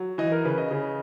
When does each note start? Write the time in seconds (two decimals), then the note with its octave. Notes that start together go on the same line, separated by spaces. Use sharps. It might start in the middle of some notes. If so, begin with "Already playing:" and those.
Already playing: F#3
0.18 E3 D#5
0.32 A#4
0.45 C#3 B4
0.58 D#5
0.71 C#3